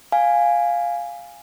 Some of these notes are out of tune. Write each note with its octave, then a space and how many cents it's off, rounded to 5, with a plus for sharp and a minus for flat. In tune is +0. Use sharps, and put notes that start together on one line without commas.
F5 +5 G#5 -5